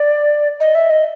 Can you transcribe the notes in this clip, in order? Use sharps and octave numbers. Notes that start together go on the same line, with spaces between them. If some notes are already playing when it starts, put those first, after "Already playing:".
Already playing: D5
D#5
E5
D#5